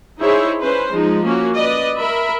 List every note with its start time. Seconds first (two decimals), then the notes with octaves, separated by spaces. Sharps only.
0.20 D#4 E4 G#4 C5 C#5 E5
0.60 C#4 B4 C5
0.91 F3 G#3 D#4
1.25 A#3 C#4 F#4
1.54 B4 D5 D#5
1.99 A#4 E5 B5